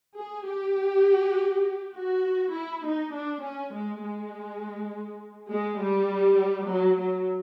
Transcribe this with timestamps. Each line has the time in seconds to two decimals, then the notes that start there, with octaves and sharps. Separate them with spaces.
0.16 G#4
0.46 G4
1.94 F#4
2.52 E4
2.82 D#4
3.12 D4
3.42 C#4
3.72 G#3
4.01 G#3
5.49 G#3
5.79 G3
6.67 F#3
6.97 F#3